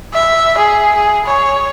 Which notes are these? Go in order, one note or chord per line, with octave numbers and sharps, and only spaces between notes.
E5
G#4
G#4
C#5